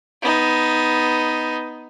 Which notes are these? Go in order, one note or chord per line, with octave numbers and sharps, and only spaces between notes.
B3 D#4